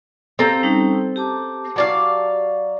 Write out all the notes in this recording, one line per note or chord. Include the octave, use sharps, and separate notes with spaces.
C4 G4 A4 F5 A#5
G3 C#4 D#4
G4 A5 D6
F#3 D5 F5